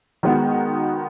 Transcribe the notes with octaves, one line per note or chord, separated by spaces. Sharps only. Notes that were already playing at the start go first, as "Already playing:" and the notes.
D#3 G#3 B3 F#4